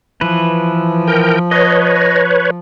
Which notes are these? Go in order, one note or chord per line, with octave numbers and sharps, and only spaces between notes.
E3 F3 B4
A#4 G5
B4 C#5 D#5